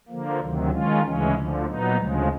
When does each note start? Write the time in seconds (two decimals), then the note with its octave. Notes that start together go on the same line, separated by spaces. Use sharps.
0.08 D3 F3 A#3
0.39 D2 C3 D#3 F#3
0.71 D#3 G#3 C#4 F4
1.03 D2 C#3 E3 G#3 C#4
1.34 D2 D3 F3
1.66 A#2 F#3 B3 D#4
1.97 D2 C#3 F3 G#3